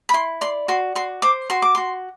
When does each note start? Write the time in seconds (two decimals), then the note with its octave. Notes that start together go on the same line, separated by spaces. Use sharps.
0.09 B5
0.14 E4 C6
0.41 D5 C6
0.68 F#4 C6
0.95 F#4 C6
1.22 C5 D6
1.50 F#4 C6
1.62 D6
1.75 F#4 C6